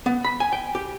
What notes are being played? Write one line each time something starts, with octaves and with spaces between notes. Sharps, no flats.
B3
B5
G#5
G5
G4